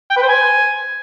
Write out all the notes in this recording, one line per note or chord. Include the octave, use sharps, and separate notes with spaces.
G5
B4
C5
G#5